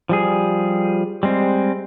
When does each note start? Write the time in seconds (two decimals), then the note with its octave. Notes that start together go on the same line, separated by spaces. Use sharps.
0.09 F3 G3 G#4
1.23 G3 G#3 C4